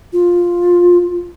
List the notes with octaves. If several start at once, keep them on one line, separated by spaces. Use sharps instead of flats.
F4